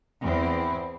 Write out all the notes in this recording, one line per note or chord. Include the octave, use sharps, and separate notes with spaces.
E2 C4 E4